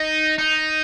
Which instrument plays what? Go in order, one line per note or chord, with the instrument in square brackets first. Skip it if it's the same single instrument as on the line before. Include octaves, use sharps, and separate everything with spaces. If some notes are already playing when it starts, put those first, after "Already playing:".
Already playing: [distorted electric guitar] D#4
D#4